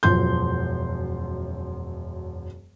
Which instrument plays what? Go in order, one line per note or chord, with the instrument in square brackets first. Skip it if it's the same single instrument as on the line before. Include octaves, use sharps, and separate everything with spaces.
[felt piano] E1 F#2 F3 C6 G6